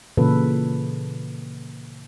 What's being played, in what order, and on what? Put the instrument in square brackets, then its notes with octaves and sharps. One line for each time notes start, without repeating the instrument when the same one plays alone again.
[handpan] A#2 C#3 E3 A4 B4